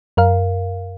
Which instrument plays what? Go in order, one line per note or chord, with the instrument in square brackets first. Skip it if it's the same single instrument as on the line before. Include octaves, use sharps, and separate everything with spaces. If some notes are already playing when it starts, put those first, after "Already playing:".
[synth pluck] F#2 A#4 F5